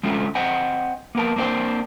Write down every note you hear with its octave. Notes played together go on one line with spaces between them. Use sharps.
G#3 A3 C4 C#4 F4
C4 C5 D#5 F#5 G#5
A#3 B3 A#4 A5
A#3 C4 D4 F#4 C5